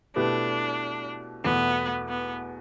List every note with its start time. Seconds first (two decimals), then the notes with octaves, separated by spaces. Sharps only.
0.16 B2 A3 D4 E4 G4 B4
1.44 E2 B2 A3 B3
2.08 B3